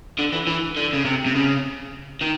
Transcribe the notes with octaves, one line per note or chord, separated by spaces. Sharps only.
D3
E3
E3
D3
C#3
C3
C3
C#3
D#3